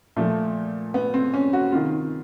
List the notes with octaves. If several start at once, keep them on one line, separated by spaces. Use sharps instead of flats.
A#2 F3 A3
B3
C4
C#4
F#4
C3 D#3 F4